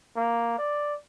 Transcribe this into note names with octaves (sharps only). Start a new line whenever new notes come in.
A#3
D5